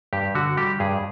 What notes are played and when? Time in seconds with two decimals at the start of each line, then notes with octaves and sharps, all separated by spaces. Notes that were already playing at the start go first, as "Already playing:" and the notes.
0.13 G2 G4
0.35 D3 F#4
0.57 G3 G4
0.80 G2 G#4